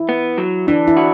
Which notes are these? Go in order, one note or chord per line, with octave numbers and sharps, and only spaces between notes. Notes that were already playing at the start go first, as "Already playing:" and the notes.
Already playing: E4
B3
F#3
E3 D4
E4
F#4